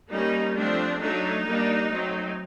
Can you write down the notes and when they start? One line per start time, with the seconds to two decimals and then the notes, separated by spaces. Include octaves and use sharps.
0.09 G3 A#3 C#4 D#4
0.55 F3 A3 C4 D4
1.00 F#3 A3 D4 D#4
1.46 G3 A#3 D4
1.91 F#3 A3 C4